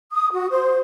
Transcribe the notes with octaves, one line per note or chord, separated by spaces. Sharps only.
D#6
F#4
C5